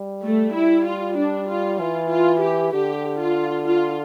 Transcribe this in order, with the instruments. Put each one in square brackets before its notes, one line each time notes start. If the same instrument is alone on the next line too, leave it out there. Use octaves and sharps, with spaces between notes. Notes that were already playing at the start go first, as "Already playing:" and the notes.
Already playing: [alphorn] G3
[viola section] A3
E4
F4
D4
F4
[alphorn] E3 [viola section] F4
[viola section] F4
G4
[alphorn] D3 [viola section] G4
[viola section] F4
F4